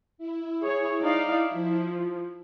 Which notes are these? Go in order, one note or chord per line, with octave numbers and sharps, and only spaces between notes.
E4
G#4 C#5
D#4 D5 F5
F3